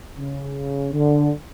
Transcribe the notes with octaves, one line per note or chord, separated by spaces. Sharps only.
C#3
D3